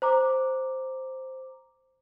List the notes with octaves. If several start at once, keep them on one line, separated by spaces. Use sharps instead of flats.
C5 A#5 D6